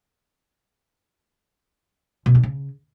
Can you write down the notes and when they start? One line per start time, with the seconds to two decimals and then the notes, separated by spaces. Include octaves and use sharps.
2.26 B2
2.35 D4
2.43 C#3